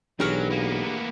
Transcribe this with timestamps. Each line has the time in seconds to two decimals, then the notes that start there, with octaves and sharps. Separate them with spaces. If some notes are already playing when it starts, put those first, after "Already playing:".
0.20 B1 E3 F#3 D4 G4 G#4 A#4 C#5
0.50 A#3 B3